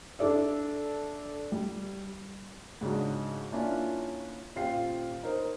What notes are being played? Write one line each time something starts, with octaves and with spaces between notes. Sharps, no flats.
D4 A4 D5 E5
G3
G#2 C#3 D4 D#4 F#4
A#3 C#4 D4 E4 F4
D#1 F4 F5 G5 C7
D#4 A#4 C5